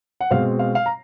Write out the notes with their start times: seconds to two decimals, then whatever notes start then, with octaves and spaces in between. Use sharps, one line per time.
0.21 F#5
0.30 B2 G#3 C4 F5
0.59 F5
0.75 F5
0.86 A#5